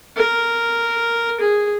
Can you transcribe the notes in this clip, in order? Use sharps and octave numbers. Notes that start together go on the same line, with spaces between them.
A#4
G#4